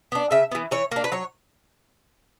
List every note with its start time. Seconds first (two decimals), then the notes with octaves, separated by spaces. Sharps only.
0.12 B3 D4
0.31 C#3 E5
0.52 E3 B3
0.71 E3 C#5
0.92 A#3 D4
1.04 B4
1.12 F#3 C#5